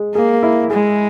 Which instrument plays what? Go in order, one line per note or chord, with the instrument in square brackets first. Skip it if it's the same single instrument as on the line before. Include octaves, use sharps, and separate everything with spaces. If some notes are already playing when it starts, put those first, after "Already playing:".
Already playing: [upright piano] G#3
[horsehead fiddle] A#3 [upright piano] G#4
[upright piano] E4
[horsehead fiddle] G#3 [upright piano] G#4